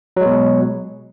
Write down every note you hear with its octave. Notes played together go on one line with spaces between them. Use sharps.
B2 F#3 G#3